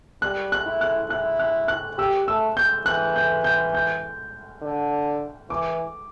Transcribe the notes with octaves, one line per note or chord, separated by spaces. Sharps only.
G3 F#6
F#6
E4
F#6
E4 F#6
F#6
F#6
G4 E6
A3 E6
G6
E3 F#6
G6
G6
G6
D3
E3 D6